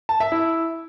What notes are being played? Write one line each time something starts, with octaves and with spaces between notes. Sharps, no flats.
A5
E5
E4